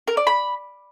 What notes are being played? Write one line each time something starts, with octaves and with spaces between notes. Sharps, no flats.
A#4
D5
B5